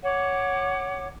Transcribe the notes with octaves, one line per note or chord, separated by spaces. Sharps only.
C#5 F#5 D6